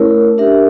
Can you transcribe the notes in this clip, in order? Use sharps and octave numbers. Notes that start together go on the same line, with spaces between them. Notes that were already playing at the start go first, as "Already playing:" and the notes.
Already playing: A3 C#4 E4 A#4 C#5
D4 G4 A#4 E5